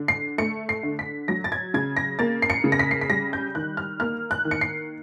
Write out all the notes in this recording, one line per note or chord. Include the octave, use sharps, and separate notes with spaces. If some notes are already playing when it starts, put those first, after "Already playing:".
Already playing: D3
C7
A3 C#7
C7
D3
B6
F#3 A#6
A6
G#6
C#3 G#6
A#6
A#3 A6
C7
C#7
C#3
A#6
B6
C7
B6
G3 A#6
G6
D#3 F#6
F6
A#3 F6
F#6
D#3
C#7
C7